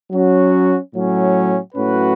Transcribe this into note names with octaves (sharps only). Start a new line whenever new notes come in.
F#3 C#4 F#4
A2 F#3 C#4
A2 F#3 C#4 F#4 B4